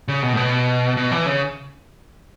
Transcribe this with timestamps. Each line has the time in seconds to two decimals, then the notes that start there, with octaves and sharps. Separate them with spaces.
0.08 C#3
0.23 B2
0.33 A2
0.37 B2
0.97 B2
1.12 E3
1.26 C#3